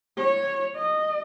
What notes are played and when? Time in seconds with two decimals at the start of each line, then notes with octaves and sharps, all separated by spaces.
0.18 C#5
0.76 D#5